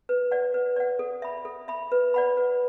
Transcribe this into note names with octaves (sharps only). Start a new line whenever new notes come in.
B4
D5 F#5
B4
D5 F#5
A4
E5 B5
A4
E5 B5
B4
D5 F#5 B5
B4